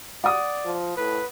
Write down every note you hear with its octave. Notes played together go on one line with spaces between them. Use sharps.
D5 F#5 D#6
F3
A2 B4